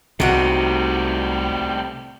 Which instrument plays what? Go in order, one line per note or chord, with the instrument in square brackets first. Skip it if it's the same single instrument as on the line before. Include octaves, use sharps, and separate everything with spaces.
[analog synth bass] C2 [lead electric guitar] A2 G3 [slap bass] C3 [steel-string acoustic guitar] D#4 F#4 F#5